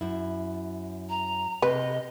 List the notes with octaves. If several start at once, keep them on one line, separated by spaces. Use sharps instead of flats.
F#2 E4
A#5
C3 B4 D#5